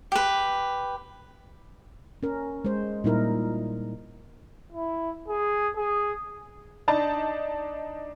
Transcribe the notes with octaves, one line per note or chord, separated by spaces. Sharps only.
G4 B4
C#4 A#4
G#3 C5
A#2 G3 D#4 E4 A#4
E4
G#4
G#4
D4 D#4 A5